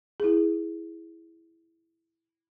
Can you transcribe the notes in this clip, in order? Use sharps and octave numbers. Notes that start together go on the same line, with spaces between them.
E4 G#4